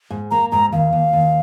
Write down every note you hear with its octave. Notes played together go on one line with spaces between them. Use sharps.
G#2
A#3 A#5
G#2 A#5
D#2 F5
D#2
D#2